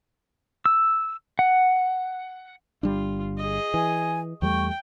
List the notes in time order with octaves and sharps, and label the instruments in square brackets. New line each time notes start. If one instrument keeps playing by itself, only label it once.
[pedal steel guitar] E6
F#5
[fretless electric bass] G1 G3 D4 [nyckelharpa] F4
[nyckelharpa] G#4 D#5
[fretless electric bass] E3 [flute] G#5
[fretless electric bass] E2 G3 A3 [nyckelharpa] G5 [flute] C#6